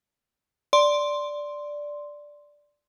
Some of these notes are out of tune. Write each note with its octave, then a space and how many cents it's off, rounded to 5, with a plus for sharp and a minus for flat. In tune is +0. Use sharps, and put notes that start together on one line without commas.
D5 +0 C6 +0